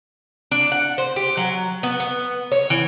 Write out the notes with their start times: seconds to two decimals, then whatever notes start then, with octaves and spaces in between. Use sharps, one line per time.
0.52 D4
0.72 F#5
0.98 C5
1.16 G4
1.37 F#3
1.83 B3
2.00 B3
2.52 C#5
2.70 E3